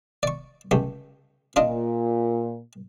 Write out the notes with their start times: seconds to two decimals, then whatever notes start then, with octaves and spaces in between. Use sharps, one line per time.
0.23 D5 C#6
0.71 C#2 A3 G4
1.56 A#2 D4 F4 D#5